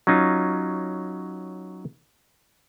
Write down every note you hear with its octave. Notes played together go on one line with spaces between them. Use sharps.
F#3 C#4 D#4 F4